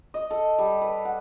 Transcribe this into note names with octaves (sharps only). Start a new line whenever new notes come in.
D#5
A4
G3
B4
F#5